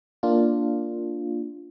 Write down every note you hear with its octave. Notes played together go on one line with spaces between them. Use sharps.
A#3 D4 F4